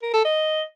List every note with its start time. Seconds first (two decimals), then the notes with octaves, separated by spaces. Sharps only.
0.03 A#4
0.14 A4
0.25 D#5